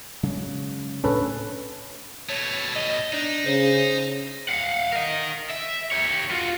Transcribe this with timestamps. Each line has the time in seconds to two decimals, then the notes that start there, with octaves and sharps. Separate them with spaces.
0.23 C#3 F#3 G#3
1.04 D2 A2 C#4 D4 A4 B4
2.29 B2 A3 C#5
2.76 D#5
3.13 D4 D#4
3.46 C#3 C5
4.49 F5 F#5
4.92 A#4 D#5
5.50 E5
5.92 G4 C#5
6.31 F4 F#4